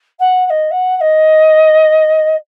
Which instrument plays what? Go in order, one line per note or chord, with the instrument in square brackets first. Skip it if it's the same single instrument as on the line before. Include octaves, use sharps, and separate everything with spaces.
[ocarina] F#5
F#5
D#5
F#5
F#5
D#5